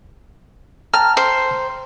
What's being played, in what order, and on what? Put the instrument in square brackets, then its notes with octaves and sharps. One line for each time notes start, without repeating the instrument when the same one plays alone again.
[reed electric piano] G5 A5 A#5 [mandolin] F6
[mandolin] C5